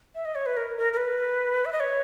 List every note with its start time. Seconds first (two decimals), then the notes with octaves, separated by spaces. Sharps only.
0.15 E5
0.25 D#5
0.35 C#5
0.46 B4
0.57 A#4
0.77 A#4
0.93 A#4
0.97 B4
1.65 E5
1.73 D#5
1.80 C#5